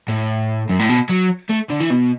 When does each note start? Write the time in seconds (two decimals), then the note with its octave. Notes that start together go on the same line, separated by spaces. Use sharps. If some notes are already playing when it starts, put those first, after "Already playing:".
0.08 A2
0.69 F#2
0.79 A2
0.89 B2
1.09 F#3
1.50 A3
1.70 D3
1.80 E3
1.90 B2